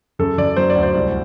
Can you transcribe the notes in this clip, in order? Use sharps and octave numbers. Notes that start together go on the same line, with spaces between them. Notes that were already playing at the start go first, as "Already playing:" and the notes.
F#2 A4
F#2 D5
F#3 C5
D5
D2
C5
C2